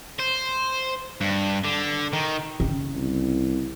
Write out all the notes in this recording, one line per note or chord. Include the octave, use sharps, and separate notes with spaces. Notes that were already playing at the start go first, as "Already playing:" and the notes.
C5
G2
D3
D#3
C#3
C2